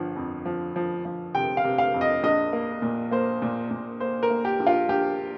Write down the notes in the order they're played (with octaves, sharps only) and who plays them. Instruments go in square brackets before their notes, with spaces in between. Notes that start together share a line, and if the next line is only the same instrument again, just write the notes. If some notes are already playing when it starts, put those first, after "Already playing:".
Already playing: [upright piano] G1 F3
F2
F3
F3
F3
C3 G5
F5
C3
F5
F2
D#5
A#1 D#5
A#3
A#2
A#3 C5
A#2
A#2
A#3 C5
A#4
A#3
G4
A#1
F4
A#1 G4